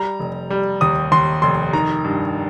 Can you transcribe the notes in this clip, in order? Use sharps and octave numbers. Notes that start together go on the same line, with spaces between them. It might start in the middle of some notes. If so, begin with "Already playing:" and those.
Already playing: G3 A#5
F1
G3
D#2 D#6
D#2 C6
F1 C6
D#3 A#5
G2